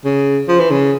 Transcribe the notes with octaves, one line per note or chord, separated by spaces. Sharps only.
C#3
F3
E3
C#3